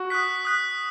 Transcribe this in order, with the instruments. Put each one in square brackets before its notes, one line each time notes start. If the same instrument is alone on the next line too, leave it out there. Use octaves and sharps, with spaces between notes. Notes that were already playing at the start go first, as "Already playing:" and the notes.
Already playing: [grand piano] F#4
[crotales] D#6 F#6 B6
D#6 F#6 B6